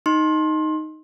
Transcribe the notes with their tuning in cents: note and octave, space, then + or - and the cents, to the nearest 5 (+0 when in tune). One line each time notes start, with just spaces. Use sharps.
D#4 +0 C6 +25